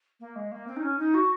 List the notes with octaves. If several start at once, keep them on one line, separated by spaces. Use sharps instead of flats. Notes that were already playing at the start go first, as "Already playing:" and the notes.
A#3
G#3
A#3
C4
D#4
C#4
D#4
F#4